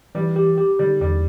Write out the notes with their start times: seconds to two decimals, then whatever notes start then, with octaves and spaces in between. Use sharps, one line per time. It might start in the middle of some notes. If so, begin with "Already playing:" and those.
0.15 E3 G3
0.36 G4
0.58 G4
0.79 D3 G3
1.01 E2 G3